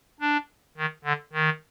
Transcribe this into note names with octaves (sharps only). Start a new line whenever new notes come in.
D4
D#3
D3
D#3